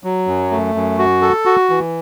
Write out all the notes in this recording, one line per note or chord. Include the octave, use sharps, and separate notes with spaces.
F#3
F#2
A3
F#2
F#4
A4
F#4
E3